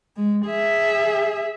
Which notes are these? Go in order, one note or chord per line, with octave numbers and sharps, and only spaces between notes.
G#3
G#4 E5